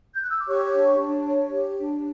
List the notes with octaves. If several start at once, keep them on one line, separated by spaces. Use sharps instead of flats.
G6
F#6
E6
D6
G4 C#5 C#6
D4
D4
C#5
G4
D4